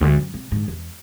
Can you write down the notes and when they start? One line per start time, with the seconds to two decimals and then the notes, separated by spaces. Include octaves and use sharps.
0.01 D2 G#3
0.17 F#2
0.34 C3
0.52 G#2 D3
0.68 E2